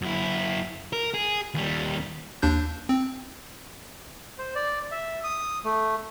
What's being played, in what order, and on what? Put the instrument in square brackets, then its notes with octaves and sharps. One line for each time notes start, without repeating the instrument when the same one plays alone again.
[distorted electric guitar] F#2 E4
A#4
G#4
D#2 G3
[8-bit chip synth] D#2 D4 G6
C4
[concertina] C5
D5
E5
D#6
A3